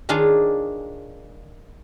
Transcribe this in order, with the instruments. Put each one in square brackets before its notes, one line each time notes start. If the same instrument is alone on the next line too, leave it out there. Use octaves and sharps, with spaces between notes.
[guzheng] D#3 D4 F4 G#4 C#5